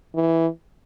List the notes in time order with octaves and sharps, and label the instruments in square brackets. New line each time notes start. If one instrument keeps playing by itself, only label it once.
[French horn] E3